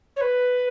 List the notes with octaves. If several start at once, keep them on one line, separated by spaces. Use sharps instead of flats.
C#5
B4